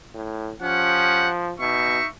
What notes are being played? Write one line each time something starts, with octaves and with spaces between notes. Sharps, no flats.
A2
F3 C#4 G4 F#5
B2 D#4 E5 C#6